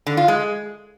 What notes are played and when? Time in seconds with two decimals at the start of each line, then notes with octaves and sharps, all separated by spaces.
0.07 D3
0.17 F4
0.28 G#3